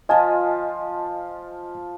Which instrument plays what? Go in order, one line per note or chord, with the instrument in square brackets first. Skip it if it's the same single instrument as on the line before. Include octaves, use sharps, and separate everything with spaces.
[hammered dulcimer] F3 F4 [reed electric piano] D#5 G#5 A5